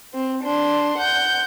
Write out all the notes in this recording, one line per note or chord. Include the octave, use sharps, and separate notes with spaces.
C4
D4 C6
F#5 G6